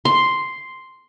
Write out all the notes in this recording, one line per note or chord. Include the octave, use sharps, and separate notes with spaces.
C6